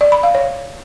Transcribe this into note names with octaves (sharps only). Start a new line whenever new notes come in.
D5
B5
F5
C#5